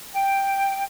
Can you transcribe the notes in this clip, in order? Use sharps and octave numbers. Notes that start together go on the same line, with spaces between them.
G5